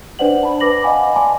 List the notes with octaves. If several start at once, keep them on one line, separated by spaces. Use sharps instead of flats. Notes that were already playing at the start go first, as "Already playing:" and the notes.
D4 B4 C5 D5 F#5 F#7
A5 B5
B4 D6 A#6 F#7
D#5 F5 F#5 G#5 B5 D6
D5 G#5 A5 C6 D6